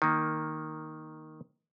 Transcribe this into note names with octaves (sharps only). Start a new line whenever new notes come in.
D#3 A#3